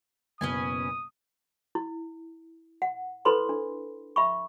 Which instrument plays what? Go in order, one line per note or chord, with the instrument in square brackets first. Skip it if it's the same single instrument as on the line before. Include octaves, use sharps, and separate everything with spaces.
[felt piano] F#1 B2 [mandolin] C#4 B4 G#5 [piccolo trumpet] D#6
[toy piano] E4
F#5
E4 A4 B4 C5 B5 C6
D4
E5 B5 C#6